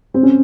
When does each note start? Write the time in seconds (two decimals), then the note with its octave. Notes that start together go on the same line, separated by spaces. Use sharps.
0.14 C4
0.23 C#4